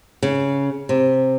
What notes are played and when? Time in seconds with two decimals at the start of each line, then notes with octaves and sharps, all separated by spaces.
0.23 C#3
0.89 C3